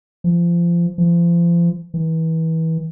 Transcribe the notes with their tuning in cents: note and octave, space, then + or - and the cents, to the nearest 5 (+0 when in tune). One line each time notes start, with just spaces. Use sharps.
F3 -25
F3 -35
E3 -30